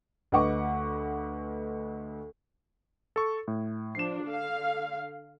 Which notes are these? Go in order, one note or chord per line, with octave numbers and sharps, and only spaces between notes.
D2 B4 D#5 F#5 C#6 D6
A4 C#6
A2
F3 D4 C7 E7
D3 F5